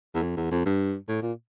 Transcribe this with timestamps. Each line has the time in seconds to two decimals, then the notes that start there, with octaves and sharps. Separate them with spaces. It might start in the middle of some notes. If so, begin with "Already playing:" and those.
0.15 E2
0.22 F2
0.37 E2
0.51 F2
0.66 G2
1.08 A2
1.22 A#2